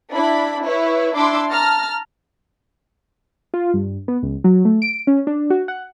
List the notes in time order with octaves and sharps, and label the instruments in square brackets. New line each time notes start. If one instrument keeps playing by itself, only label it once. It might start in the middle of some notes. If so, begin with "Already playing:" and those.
[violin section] D4 E4 B5
E4 B4 C#5
D4 E4 C6 D6 E6
A5 A#5 F6
[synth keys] F4
G2
B3
C#2
F#3
A3
D7
C#4
D4
F#4
F#5